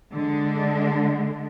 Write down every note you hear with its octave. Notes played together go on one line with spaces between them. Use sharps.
D3 G#3 D4